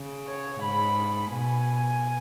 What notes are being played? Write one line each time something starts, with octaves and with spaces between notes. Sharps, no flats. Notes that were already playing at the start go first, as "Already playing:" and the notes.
Already playing: C#3
C#5
G#2 B5
B2 G#5